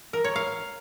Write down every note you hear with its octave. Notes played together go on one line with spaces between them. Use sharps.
A#4
C#5
F5